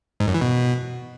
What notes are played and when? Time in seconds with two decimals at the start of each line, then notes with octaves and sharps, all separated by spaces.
0.20 G#2
0.27 F#2
0.34 E3
0.41 B2